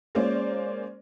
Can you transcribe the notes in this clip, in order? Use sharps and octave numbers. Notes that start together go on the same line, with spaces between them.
G#3 A#3 C#4 C5 D5